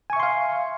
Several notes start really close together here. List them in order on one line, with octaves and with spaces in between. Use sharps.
G#5 C#6 E5 C6 F5